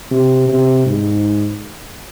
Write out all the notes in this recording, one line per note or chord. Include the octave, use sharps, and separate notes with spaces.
C3
C3
G#2